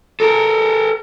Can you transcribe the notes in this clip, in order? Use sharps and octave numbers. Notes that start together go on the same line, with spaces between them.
A4 A#4